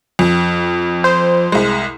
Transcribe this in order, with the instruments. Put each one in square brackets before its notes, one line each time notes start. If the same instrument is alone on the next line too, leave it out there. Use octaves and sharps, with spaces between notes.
[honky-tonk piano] F2
[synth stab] C5
[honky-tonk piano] C2 G#3